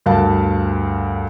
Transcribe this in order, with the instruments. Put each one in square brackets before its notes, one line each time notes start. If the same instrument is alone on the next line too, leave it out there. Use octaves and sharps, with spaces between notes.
[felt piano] D2 G2 A#4 F5 A5